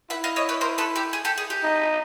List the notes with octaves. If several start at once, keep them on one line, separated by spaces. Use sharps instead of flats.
E4 E5 F#5
D#5 F5
C#5 D#5
B4 C#5
A#4 C5
A4 B4
G4 A4
G#4
G4 A4
G#4
G4
D#4